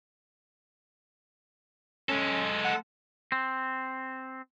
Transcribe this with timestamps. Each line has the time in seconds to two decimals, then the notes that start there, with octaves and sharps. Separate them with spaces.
2.09 G#3 C#4 A4
2.64 F#5
3.32 C4